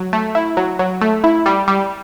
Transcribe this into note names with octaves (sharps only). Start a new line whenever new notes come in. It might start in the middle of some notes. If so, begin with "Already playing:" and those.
Already playing: F#3
A3
E4
F#3
F#3
A3
E4
G3
G3